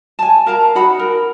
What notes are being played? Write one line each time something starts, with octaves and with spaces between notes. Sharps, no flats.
G#5 A5
A#4 F5 A5 A#5
D#4 F#4 F#5 B5
A#4